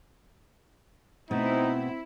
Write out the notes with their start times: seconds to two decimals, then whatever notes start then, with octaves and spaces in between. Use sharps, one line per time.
1.31 B2 A3 B3 C4 D#4 E4